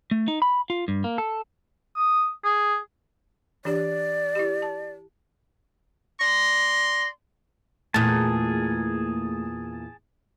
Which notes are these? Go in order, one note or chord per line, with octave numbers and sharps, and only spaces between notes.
A3
D#4
B5
F4
G2
A#3
A4
D#6
G#4
E3 D4 G4 D5
E4 G4
A5
D5 C6 A#6
E2 A#2 A3 G#4 A5